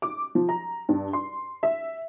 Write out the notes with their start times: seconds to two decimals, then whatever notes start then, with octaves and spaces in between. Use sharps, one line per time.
0.02 D6
0.35 F3
0.49 A#5
0.89 G2
1.13 C6
1.63 E5